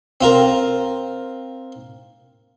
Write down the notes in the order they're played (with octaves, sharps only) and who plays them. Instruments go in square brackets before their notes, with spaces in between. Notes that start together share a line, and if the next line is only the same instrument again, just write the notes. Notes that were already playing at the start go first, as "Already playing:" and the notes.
[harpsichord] C4 F4 A#4